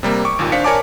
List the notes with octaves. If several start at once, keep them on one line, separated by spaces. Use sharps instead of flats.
C3 G3 A#3
C#6 D6
G#1 D#2 A#2
D4 C5 F5 B6 C#7
A#4 C#5 D5 G#5 A5 D6